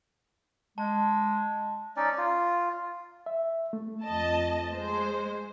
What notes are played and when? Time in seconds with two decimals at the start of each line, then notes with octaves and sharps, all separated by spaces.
0.78 G#3 A5
1.96 C#4 D#4 D5
2.18 F4
3.26 E5
3.73 A3
4.03 F2 D#5 A5
4.73 G#3 C5